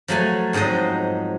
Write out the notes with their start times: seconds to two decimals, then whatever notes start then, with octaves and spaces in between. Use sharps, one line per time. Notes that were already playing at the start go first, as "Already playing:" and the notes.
0.08 F3 F#3 A3 G#5
0.53 F2 G#2 F#3 C5 D#5